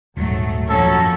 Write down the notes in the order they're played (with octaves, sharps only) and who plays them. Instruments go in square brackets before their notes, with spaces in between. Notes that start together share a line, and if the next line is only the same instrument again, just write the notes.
[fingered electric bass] D#1 [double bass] G#2 [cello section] F#3 A3
[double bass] F#2 F3 [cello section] F#3 A#3 C#4 [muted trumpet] A4